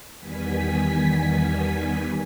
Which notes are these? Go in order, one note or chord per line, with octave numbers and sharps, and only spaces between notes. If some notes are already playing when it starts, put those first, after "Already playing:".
E2 D#3 G3 B3 G#5 B6